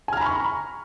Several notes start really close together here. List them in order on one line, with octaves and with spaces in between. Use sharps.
G#5 F6 A#5 B5 C#6